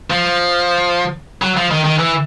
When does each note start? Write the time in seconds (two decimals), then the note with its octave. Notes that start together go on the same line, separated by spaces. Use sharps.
0.10 F3
1.42 F#3
1.57 F3
1.71 D#3
1.85 D#3
1.99 E3